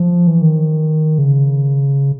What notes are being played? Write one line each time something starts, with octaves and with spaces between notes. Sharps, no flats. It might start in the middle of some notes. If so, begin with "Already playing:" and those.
Already playing: F3
E3
D#3
C#3